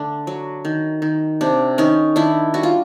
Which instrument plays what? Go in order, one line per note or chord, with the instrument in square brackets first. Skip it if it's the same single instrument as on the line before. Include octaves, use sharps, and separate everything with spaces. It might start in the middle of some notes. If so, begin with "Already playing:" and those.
Already playing: [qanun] D3 A3 D4
F#3
D#3
D#3
C3 D4
D#3 C#4 D#4
D#3 D4 E4
G3 F#4
F4